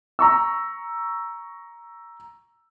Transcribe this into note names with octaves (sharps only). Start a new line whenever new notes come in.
A#5 C#6 E6